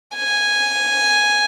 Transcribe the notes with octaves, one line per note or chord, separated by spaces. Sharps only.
G#5